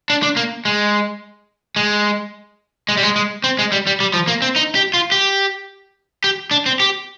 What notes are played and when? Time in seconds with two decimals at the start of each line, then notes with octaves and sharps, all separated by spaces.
0.10 D4
0.23 D4
0.36 A#3
0.65 G#3
1.76 G#3
2.89 G#3
2.97 G3
3.03 G#3
3.16 G#3
3.44 C4
3.59 G#3
3.72 G3
3.87 G3
4.00 G3
4.14 F3
4.28 A#3
4.42 C4
4.56 D#4
4.75 G4
4.94 F4
5.12 G4
6.24 G4
6.51 D4
6.66 C4
6.80 G4